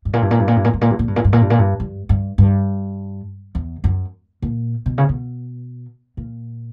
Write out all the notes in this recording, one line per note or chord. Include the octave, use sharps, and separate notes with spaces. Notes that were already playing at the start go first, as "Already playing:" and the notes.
G2
A#2
G2
A#2
G2
A#2
G2
A#2
G2
A#2
G2
A#2
G2
A#2
G2
A#2
G2
A#2
G2
G2
G2
G2
E2
F#2
A#2
B2
C#3
B2
A#2